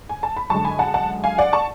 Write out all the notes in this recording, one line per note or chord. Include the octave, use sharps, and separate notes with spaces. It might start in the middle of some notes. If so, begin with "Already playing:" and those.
G#5
A5
B5
F#2 D3 G#3 A5 C#6
G#5 B5
F#5 A5
F#5 A5
F5 G#5
D5 F#5
A5 C#6